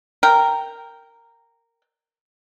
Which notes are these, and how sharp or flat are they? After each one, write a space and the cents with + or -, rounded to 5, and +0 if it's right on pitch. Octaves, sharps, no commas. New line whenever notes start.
A#4 -10 G5 +0